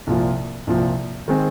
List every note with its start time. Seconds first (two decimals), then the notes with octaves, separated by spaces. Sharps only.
0.07 C2 A#2 F3
0.67 C2 A#2 F3
1.28 D#3 G#3 C4